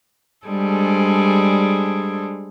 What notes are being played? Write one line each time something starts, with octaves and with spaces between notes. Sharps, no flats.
G3 G#3 D4 G#4 A4 C5